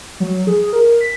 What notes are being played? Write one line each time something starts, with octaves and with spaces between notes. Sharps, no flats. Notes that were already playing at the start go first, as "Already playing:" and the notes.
F#3
G#4
A#4
B6